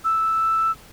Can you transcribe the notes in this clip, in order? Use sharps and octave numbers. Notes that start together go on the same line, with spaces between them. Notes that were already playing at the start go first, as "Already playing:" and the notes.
E6